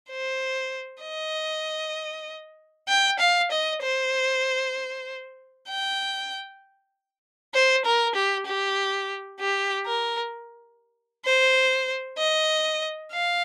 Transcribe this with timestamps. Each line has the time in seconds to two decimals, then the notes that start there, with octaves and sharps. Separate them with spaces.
0.10 C5
1.02 D#5
2.88 G5
3.19 F5
3.52 D#5
3.82 C5
5.69 G5
7.54 C5
7.86 A#4
8.15 G4
8.46 G4
9.40 G4
9.86 A#4
11.25 C5
12.19 D#5
13.12 F5